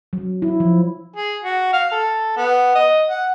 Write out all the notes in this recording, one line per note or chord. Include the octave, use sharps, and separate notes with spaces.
F#3
E4
F3
G#4
F#4
F5
A4
B3
D#5
F#5